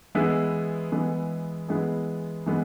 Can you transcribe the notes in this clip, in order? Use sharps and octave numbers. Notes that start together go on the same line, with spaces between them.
E3 G#3 B3 E4 G#4
E3 G#3 B3 E4 G#4
E3 G#3 B3 E4 G#4
E3 G#3 B3